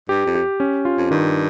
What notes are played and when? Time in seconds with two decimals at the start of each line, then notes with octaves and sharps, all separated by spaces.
0.09 G2 G4
0.26 F2
0.35 G4
0.60 C#4
0.85 F4
0.98 F2
1.11 G2 D#3